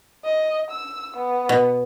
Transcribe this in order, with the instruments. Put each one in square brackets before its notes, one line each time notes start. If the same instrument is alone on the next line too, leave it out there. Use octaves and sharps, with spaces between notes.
[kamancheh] D#5
E6
B3
[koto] B2